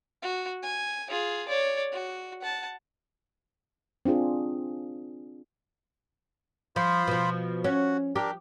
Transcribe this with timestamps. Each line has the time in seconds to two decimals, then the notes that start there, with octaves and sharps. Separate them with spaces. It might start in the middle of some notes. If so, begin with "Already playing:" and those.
0.22 F#4
0.63 G#5
1.09 F4 G#4
1.48 C#5 D5
1.92 F#4
2.41 F#5 A5
4.05 C4 D4 F4 G#4
6.76 F3 F4 C5 B5
7.08 B2 F3
7.64 C#4 F#4
8.16 D4 G4 A#4